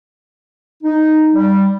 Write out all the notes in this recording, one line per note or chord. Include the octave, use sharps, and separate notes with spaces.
D#4
G3